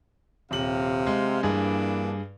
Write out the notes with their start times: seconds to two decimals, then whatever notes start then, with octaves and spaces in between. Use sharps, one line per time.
0.51 D#1 C3 F5 F#7
1.07 G#3
1.43 G2 E3 A#3 D4 G#4